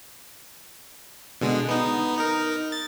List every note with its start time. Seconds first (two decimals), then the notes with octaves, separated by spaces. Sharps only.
1.41 B2 D3 G#3
1.69 B3 D#4
2.17 D#4 A#4
2.72 A6